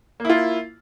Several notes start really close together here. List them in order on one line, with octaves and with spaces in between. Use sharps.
A#3 E4 F4